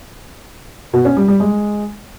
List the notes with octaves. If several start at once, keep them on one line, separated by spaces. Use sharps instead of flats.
B2
C#4
G3
G3
G#3